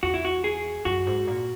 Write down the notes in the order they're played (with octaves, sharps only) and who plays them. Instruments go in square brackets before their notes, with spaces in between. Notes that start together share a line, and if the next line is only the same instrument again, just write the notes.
[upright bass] E2 [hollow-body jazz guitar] F#4
[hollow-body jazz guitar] E4
F#4
G#4
[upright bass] F#2 [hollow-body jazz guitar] F#4
[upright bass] G#2
A#2